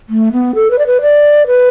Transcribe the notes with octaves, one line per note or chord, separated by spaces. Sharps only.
A3
B3
A4
B4
D5
B4
D5
B4